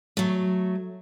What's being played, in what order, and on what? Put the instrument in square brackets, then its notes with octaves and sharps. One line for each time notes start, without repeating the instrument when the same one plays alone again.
[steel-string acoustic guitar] F#3 A3